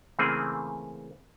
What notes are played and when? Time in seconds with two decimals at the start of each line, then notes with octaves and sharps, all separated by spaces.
0.19 C#3 E3 A3 A#3 C4 G#4